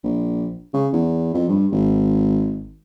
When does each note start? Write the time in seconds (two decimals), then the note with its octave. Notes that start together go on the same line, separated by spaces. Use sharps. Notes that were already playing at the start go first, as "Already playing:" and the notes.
0.03 A#1
0.74 C#3
0.93 E2
1.34 F2
1.49 G2
1.72 G#1